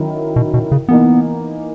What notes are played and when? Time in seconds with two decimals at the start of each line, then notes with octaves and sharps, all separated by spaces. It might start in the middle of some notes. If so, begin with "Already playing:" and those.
Already playing: D#3 F#3 C#4 E4
0.36 B2
0.54 B2
0.72 C#3
0.89 E3 A#3 B3 D#4